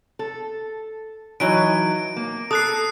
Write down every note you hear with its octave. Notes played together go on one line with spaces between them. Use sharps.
A4
E3 F#3 D#4 D7
A#3
A4 D#6 F#6 C7